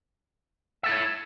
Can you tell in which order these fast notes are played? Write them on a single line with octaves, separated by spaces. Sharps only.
E5 A4 E4 C#5